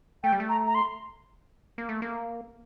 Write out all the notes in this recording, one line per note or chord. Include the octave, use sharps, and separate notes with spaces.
A3 G5
G3
A3
A#5
A#5
C6
A#3
A3
A#3